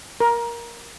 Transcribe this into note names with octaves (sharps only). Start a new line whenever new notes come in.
A#4